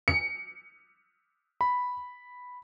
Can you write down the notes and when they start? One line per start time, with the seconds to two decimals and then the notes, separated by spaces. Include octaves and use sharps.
0.08 C#7
1.61 B5